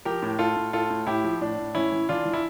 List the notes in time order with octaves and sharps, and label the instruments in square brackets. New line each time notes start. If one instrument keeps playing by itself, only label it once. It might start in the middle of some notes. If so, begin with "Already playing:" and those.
[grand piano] F3 G4 A#4
A2
A2 F4 A4
A2
A2 F4 A4
A2
A2 E4 G4
F3
A2 D4
A2
E3 C#4 E4
E3
E3 D4 F4
E3
E4